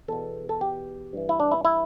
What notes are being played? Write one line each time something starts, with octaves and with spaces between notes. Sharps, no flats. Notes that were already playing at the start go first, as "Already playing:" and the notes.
E2 B2 A4
A4
G4
G2 E3
E4
D4
E4
E4